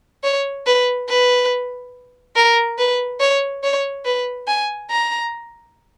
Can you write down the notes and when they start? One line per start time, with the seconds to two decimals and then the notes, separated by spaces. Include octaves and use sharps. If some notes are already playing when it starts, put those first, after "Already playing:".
0.23 C#5
0.66 B4
1.09 B4
2.36 A#4
2.78 B4
3.20 C#5
3.63 C#5
4.05 B4
4.47 G#5
4.90 A#5